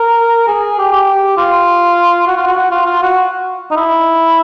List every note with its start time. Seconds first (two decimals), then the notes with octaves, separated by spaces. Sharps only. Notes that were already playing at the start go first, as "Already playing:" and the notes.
Already playing: A#4
0.48 G#4
0.78 G4
0.92 G4
1.37 F4
2.27 F#4
2.37 F4
2.47 F#4
2.57 F#4
2.71 F4
2.86 F4
3.02 F#4
3.71 D#4
3.76 E4